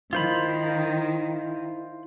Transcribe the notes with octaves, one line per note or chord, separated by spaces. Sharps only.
D#3 E4 F4 C5 B5